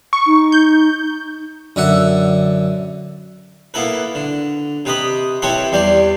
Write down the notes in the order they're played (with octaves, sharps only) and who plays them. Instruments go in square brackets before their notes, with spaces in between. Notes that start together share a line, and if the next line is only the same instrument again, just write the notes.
[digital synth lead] C#6
[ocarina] D#4
[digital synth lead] G6
[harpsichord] F#2 D3 E5 F#5
A#3 B3 E4 A4 B4
D3
C3 B4 D#5 B5
C4 E4 G4 A4 B4 C#5
E2 G3 G4 D5 C6